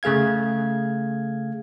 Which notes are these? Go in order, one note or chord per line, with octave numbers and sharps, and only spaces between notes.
C#3 A3 G#4 F5 G#6